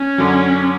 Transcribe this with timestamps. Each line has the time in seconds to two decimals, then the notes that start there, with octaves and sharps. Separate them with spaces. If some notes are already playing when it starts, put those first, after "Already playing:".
Already playing: C#4
0.18 F#2 D3 F#3